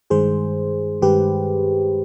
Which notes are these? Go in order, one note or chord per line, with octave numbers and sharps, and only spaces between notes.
G2 D#3 G#3 G#4 C5
G2 D#3 G#3 G4 B4